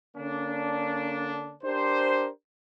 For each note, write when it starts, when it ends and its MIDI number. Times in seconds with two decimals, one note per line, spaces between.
0.16 1.55 50
0.16 1.55 58
0.16 1.55 61
0.16 1.55 62
1.63 2.29 62
1.63 2.29 67
1.63 2.29 70
1.63 2.29 72